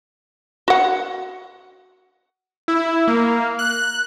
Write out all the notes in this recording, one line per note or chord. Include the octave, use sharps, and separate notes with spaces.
F#4 F#5
E4
A#3
F#6